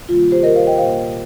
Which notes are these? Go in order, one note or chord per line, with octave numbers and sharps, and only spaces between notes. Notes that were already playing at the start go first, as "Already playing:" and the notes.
C3 D#3 G3 A#3 F4
G4 C5
A#4 D#5
C5 F5
D#5 G5
A#2 A#3 C5 F5